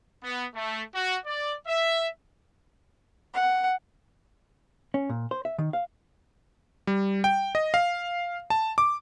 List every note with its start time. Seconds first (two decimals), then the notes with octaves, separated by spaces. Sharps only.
0.23 B3
0.54 A3
0.94 F#4
1.26 D5
1.67 E5
3.33 F#5
4.94 C#4
5.09 A#2
5.31 C5
5.45 E5
5.58 D#3
5.73 F5
6.87 G3
7.24 G5
7.55 D#5
7.74 F5
8.50 A5
8.78 D6